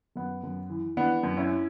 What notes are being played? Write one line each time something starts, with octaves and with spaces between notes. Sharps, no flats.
F#2 B3
F#2
E3
E3 B3 D4
F#2
C#4 E4